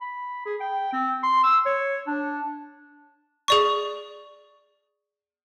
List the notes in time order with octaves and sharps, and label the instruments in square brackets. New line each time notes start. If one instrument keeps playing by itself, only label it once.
[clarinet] B5
G#4
G5
C4
C6
E6
C#5
D4
[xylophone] G#4 D5 C#6